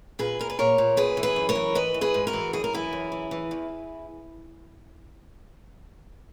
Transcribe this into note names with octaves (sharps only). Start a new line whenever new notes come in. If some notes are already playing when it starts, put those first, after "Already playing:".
A#2 G#4 B4
A#2 A#4
B4
A#2 A#4 C#5
A#2
F#2 G#4 B4
E3
G#4 B4
F#2
A#4 C#5
E3
G#2 B4 D#5
E3
G#4 B4
G#2
F#4 A#4
E3
F#2 G#4
A#4
E3 E4 G#4
F#2
E3
E3
E2